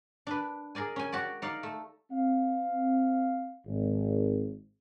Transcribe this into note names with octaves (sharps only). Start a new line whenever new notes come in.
D4 B4
G#4 A#4 D5 G#5
C#4 G#5
F#4 G4 D5
D#4 D5 F5
A3
C4 F5
G#1